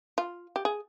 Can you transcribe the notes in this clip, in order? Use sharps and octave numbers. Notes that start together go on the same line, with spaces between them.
F4
G4
G#4